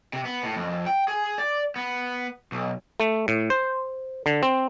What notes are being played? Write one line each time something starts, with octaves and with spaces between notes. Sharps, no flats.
C3
B3
A2
F2
G5
G#4
D5
B3
B1
A3
A2
C5
D3
C4